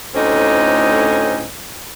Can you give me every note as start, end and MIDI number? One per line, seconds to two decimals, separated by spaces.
0.14 1.45 38
0.14 1.45 45
0.14 1.45 60
0.14 1.45 61
0.14 1.45 63